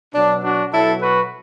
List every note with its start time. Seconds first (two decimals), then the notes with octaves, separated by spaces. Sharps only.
0.14 B2 F#3 D4
0.43 D4 F#4
0.73 B2 F#3 E4 A4
1.01 F#4 B4